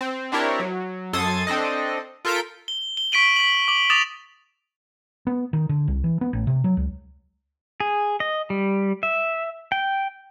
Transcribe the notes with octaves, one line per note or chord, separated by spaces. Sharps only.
C4
C4 D4 E4 G4 A#4 C#5
F#3
F#2 A4 C6 D#6 G#6 A6
C4 D4 A4 D#5
F4 A4 A#4 G6 B6 D7
G7
G7
C#6 B6 D7 D#7 F#7
B6 F#7
D6 F#7
D6 D#6 A6 E7 F7
B3
D#3
D3
C2
E3
B3
A1
C3
F#3
C#2
G#4
D#5
G3
E5
G5